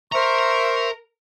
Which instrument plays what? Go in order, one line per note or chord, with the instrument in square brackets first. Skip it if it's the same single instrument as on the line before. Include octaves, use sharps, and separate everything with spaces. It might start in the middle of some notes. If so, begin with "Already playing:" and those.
[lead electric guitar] A#4 A#5 [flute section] C5 E5 C#6